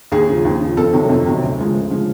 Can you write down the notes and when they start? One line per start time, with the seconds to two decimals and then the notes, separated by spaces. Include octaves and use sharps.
0.12 D#2 G#4
0.28 C#3 F3
0.45 D#2
0.60 C#3 F3
0.77 F2 A4
0.93 C3 D#3 F#3
1.09 F2
1.25 C3 D#3 F#3
1.42 D2
1.58 C#3 F3 G#3
1.74 D2
1.90 C#3 F3 G#3